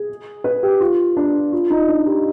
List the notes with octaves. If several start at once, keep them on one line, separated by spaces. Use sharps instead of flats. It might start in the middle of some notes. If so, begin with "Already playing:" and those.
Already playing: G#4
B4
G4
F4
D4
F4
D#4
D4
G4